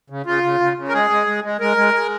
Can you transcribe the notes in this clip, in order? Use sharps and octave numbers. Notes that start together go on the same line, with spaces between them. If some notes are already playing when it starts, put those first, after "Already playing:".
C#3
C#3 F4
C#3
C#3
C#3
A#4
G#3 G#4
G#3
G#3
G#3
G#3 A#4
G#3
G#3